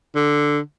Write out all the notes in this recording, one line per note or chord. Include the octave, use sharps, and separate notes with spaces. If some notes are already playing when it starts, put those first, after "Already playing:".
D3